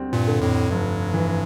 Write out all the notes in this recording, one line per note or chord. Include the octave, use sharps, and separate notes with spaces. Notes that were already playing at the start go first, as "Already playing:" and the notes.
Already playing: D2 G3 C4
G2 A#2
D3
F2 A2
F1 G2
E3